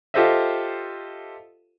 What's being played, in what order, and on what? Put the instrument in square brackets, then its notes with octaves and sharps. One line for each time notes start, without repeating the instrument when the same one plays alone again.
[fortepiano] F4 G4 A4 C5 D#5 E5